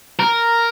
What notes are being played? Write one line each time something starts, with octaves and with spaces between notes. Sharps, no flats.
A#4